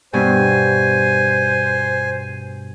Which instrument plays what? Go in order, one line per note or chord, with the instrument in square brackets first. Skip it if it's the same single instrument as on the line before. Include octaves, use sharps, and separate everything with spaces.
[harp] G2 B2 F#4 [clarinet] C5 [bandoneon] G#5